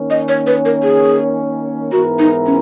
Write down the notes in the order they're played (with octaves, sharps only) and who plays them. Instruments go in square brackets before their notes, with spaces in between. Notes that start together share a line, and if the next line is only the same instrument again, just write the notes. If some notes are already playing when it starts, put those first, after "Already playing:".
Already playing: [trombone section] D#3 A#3 C#4
[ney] D#5
C#5
B4
A#4
G#4
[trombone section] G#2 E3 B3 E4 A#4 [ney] F#4
[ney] D#4
C#4